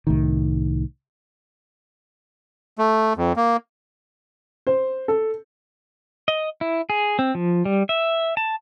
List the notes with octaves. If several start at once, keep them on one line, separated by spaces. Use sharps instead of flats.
C2 A2 D#3
A3
F2
A#3
C5
A4
D#5
E4
G#4
C4
F3
G3
E5
A5